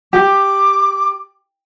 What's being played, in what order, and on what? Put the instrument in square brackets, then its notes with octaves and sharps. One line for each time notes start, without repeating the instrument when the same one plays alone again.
[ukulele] G4 [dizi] D6